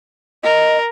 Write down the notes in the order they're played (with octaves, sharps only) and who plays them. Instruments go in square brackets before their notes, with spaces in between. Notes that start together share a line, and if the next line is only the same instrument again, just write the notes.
[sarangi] A#4 [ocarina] D#5